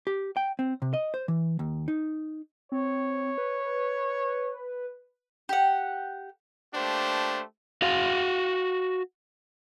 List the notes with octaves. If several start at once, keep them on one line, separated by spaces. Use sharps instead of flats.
G4
G5
C4
C3
D#5
C5
E3
D#2
D#4
C4 C#5
B4
G4 F#5
A3 A#3 D4 G4 C5
F#4 F5